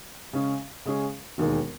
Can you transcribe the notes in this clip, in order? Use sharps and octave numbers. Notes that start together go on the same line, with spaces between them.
C#3 G#3 C#4 G#4
C#3 G#3 C#4 G#4
E1 D#2 D#3 G#3